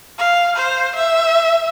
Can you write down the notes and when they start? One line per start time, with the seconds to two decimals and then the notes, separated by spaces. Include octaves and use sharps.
0.18 F5
0.56 C5
0.96 E5